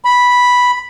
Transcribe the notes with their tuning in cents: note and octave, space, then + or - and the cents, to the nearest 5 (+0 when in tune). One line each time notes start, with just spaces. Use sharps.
B5 -5